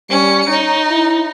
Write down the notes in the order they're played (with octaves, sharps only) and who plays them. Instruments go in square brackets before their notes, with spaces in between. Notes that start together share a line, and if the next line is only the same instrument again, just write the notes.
[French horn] G3 [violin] C#4 C#7
[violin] D#4 [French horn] C#5
[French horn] E4